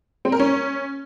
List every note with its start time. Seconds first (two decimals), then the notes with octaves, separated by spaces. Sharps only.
0.25 C4
0.32 A#4
0.40 C#4